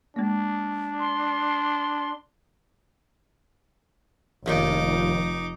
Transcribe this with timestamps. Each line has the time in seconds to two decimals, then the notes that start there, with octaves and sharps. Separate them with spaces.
0.16 G#3 A#3 D4
1.00 C6
4.46 F1 A#1 D#2 A#2 D#4 D6